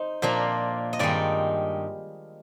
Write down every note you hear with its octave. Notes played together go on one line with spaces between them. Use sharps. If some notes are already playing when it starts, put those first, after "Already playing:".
Already playing: D#4 C5
A#2 F3 A#3 D4
D#5
G2 D#3 G#3 D#4 D5